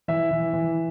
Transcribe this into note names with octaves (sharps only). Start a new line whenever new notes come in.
E3 E5
E3
E3